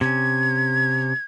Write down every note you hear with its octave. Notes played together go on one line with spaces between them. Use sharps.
C3 C#4 G#6